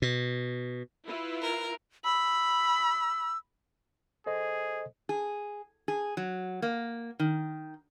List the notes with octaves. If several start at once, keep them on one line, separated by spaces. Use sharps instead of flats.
B2
E4 F4 B4
A#4
B5 E6
G#4 A4 C5 D#5
G#4
G#4
F#3
A#3
D#3